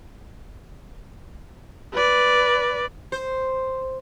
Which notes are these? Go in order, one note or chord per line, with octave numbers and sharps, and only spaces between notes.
B4 D5
C5